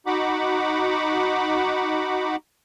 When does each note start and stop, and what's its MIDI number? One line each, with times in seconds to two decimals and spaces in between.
0.07 2.36 63
0.07 2.36 66
0.07 2.36 78
0.07 2.36 83
0.07 2.36 86